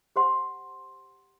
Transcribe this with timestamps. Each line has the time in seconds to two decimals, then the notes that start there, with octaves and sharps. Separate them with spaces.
0.16 G4 C5 F#5 C6